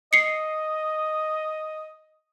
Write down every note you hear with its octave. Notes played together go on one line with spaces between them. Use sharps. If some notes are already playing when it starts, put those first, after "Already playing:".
D#5 C7 C#7